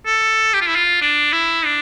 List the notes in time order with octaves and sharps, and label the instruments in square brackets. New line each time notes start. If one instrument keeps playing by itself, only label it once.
[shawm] A4
G4
F4
E4
F4
D4
E4
D4